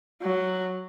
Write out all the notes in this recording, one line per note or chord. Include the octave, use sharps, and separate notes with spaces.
F#3